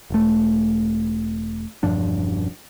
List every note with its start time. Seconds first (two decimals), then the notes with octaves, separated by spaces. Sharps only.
0.10 E1 A3
1.83 E1 G2 F3 D4